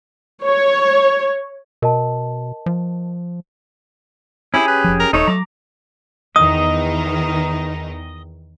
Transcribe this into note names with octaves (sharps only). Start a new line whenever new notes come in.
C#5
B2 A#4 D#5 A5
F3
C#4 E4 G4 G#4
B4
F1 F3
A#4
D#1 A3 D#4 C#5
F#3 A#5 D6
E2 D#3 D#4 D#5 D#6